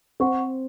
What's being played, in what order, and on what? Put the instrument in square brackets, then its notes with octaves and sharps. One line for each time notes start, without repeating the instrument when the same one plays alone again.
[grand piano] C4 [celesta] C5 F#5 C#6